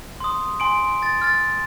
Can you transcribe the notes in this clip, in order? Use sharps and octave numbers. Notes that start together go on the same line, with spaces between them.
C6 D#6
G#5 C6 D7
A6
F6 A6